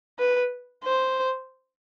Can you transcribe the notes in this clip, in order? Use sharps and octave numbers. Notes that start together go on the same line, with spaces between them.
B4
C5